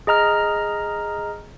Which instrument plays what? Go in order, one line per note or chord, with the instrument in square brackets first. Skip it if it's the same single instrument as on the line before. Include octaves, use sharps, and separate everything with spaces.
[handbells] G#4 D#5 A#5 F6